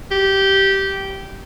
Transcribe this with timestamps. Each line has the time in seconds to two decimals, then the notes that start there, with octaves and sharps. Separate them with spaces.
0.11 G4